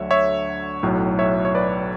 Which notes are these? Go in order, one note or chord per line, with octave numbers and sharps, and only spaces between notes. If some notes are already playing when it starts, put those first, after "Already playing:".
Already playing: D2 D3 F#3 C#5 E5
C#5 E5
B1 A2 F#3
C#5 E5
C#5
B4 D5